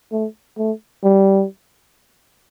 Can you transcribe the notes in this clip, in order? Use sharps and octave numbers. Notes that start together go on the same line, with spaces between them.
A3
A3
G3